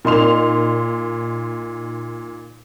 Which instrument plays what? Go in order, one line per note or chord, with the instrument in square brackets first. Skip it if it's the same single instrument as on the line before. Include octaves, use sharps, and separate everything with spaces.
[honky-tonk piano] A#2 D#4 C6 F7